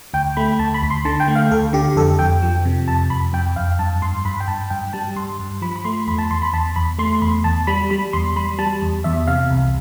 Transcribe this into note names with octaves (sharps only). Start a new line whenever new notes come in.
D2 G5
A3 B5
D2 A5
B5
D2
C6
D3 A5
G5
A3
F5
D2 A4
D3 G4
F2 A4
F2 G5
F3
C3
F2 A5
F2 B5
F2 G5
F2 F5
G2 A5
G2 C6
G2 B5
G5
G2 A5
G2 G5
G3 A5
G2 C6
G2
F3 B5
B5
A3 C6
E2 B5
A5
E2 C6
B5
E2 A5
E2 B5
A3 C6
E2 B5
E2 A5
G3 B5
G3 B5
E2 C6
G3 B5
G3 A5
E2
E2 E5
C3 F5
C2